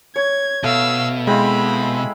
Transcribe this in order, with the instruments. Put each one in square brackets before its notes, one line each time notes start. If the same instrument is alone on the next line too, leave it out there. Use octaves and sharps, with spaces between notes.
[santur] C#5 [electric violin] G#6
[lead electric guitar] B2 [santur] A3 [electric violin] F5 E6
[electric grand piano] G#3 [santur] C4 E4 F5 [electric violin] B5